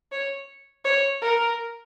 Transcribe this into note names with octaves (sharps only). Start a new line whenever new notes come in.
C#5
C#5
A#4